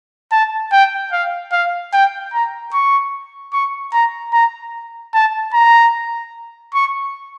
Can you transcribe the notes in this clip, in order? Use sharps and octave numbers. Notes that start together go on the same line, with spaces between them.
A5
G5
F5
F5
G5
A#5
C#6
C#6
A#5
A#5
A5
A#5
C#6